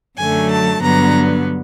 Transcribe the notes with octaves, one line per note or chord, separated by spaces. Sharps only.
F#2 D3 F#3 A3 G#5
A5
G2 D3 F#3 B3 A#5